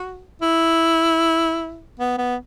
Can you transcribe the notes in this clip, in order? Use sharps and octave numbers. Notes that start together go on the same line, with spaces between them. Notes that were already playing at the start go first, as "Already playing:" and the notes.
Already playing: F#4
E4
B3
B3